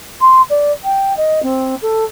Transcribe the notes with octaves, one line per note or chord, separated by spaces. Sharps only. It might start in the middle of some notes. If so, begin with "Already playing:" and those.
C6
D5
G5
D#5
C4
A4